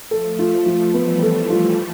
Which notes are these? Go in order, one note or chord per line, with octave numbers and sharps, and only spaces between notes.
F3 A3 A4
F4
F3
E3 G3 B3
A4
F4